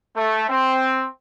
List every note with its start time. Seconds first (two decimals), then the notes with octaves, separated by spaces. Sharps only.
0.16 A3
0.49 C4